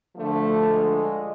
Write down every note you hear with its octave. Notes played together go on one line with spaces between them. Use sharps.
D2 D3 F3 A3
G#3